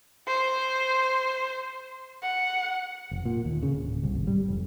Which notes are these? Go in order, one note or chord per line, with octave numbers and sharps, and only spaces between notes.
C5
F#5
F1
A#2
D#2
C#3
D1
C2
G#1
G3
F1